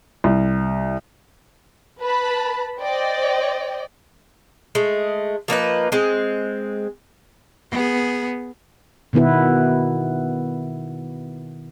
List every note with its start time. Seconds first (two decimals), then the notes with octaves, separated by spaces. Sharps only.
0.24 C2
2.01 B4 A5 B5
2.80 C5 D5 D#5 G5
4.75 G#3 A3
5.48 F3 A#3 D#4 B4
5.92 G#3 C4
7.71 B3 G#4
9.13 B2 D#3 B3 E4 B4